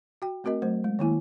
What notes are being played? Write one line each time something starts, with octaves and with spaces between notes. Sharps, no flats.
F#4 G5
A3 C4 F#4 A#4 D#5
F#3 A3 C5
G#3
D#3 A#3 E4 G#5